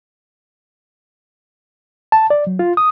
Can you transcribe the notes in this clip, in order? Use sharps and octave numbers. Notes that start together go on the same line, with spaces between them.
A5
D5
F#3
F4
D#6